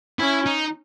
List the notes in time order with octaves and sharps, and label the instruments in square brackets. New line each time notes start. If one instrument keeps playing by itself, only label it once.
[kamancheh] C#4 [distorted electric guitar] E4
[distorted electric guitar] D#4